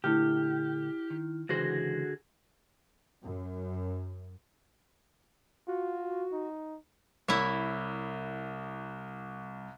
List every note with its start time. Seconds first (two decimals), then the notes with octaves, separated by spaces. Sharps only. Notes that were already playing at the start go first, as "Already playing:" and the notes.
0.04 A#2 D3 A3 E4 G4 F6
1.10 D#3
1.49 C#2 D3 E3 F#4 G#4 C5 A#6
3.22 F#2
5.68 F4 F#4
6.32 D#4
7.28 C2 E4 C#5